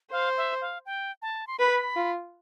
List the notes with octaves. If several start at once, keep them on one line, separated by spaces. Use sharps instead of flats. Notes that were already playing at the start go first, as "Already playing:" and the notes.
C5 F5
E5
F5
G5
A5
C6
B4 B5
F4